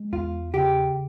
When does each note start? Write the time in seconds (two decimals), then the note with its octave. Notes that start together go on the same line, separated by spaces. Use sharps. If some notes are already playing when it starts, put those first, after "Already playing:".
Already playing: G#3
0.12 E2 F4
0.54 C#3 G4